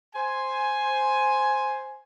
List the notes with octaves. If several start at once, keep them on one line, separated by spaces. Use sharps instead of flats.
C5 G#5